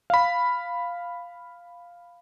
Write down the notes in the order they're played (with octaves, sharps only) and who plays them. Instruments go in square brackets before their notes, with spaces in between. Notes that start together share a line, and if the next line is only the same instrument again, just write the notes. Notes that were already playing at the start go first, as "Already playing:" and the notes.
[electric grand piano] F5 B5